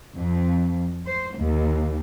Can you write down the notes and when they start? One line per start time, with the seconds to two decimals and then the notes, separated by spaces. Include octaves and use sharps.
0.15 F2
1.07 C5
1.36 D#2